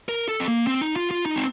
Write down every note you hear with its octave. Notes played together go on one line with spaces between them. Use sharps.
A#4
A4
C4
A#3
C4
D#4
F4
F4
D#4
C4